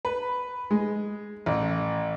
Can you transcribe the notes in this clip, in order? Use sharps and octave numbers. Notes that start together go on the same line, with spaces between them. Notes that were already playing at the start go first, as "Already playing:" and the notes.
B4
G#3
A1